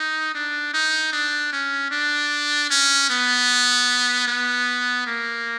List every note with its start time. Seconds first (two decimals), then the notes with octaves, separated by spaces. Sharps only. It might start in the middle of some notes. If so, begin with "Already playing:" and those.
Already playing: D#4
0.35 D4
0.74 D#4
1.13 D4
1.53 C#4
1.91 D4
2.71 C#4
3.10 B3
4.27 B3
5.07 A#3